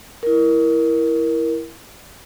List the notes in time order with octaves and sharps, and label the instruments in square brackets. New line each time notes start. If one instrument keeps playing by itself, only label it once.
[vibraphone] E4 A#4